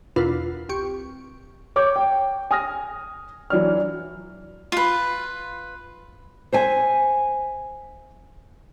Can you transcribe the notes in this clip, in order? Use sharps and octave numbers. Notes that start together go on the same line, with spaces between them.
E2 B2 D4 F4 A#4 B4
C2 G4 C#6
C#5 D6 G6
G5
G#5 D#6 F6 A#6
E3 F#3 D4 F6
F4 B4
C5 E5 G#5